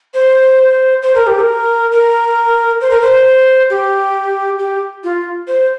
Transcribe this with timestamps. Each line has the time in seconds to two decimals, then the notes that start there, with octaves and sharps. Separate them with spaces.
0.14 C5
1.02 C5
1.15 A#4
1.27 G4
1.39 A#4
1.92 A#4
2.81 C5
2.91 A#4
3.01 C5
3.70 G4
4.59 G4
5.04 F4
5.47 C5